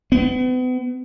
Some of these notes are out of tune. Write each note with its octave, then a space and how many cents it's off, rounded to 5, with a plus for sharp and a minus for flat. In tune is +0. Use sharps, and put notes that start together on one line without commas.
B3 +40